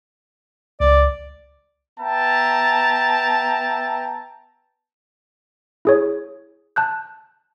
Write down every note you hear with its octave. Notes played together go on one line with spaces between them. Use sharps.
C#2 D5
B3 E5 G5 A5 A#5
E4 G#4 C#5
A5 F#6 G6